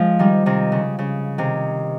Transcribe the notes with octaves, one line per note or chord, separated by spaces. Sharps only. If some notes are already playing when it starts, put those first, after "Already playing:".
Already playing: F3 G#3
D#3 G3
C3 D#3
C#3
C#3
C3 D#3